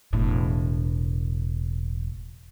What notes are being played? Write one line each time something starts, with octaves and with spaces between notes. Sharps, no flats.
E1 A2